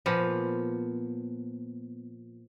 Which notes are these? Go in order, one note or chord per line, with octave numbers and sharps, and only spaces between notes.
A#2 F3 B3